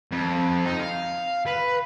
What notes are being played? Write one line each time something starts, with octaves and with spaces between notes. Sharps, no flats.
F2
D#4
F5
B4